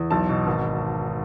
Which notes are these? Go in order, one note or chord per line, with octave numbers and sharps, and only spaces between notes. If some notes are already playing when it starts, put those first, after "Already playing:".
Already playing: E2
B1 A5
B2
G#1